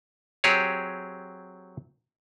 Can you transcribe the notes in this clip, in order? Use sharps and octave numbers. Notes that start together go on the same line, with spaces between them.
F#3 C4 G4 G#4 C#5